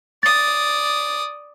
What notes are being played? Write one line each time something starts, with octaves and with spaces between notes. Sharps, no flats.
D5 D#6 A6